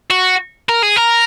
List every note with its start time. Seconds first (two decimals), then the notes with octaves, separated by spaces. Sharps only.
0.11 F#4
0.69 A#4
0.83 G#4
0.97 A#4